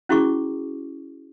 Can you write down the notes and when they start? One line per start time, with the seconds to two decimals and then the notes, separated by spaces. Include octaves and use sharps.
0.09 C#4 E4 F#4 G#4 C#6 D6